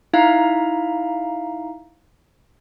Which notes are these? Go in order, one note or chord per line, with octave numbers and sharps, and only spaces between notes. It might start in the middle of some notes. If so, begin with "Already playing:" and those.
D#4 E4 E5 F5 A#5